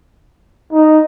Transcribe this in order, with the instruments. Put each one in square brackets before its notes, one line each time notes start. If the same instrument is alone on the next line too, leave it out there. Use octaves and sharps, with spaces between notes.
[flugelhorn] D#4